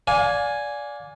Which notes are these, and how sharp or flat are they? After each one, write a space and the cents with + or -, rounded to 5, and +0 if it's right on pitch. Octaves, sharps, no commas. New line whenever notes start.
D5 -15 F5 +30 G#5 +0